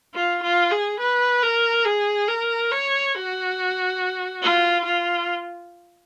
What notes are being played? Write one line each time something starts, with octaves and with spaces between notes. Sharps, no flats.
F4
F4
G#4
B4
A#4
G#4
A#4
C#5
F#4
F4
F4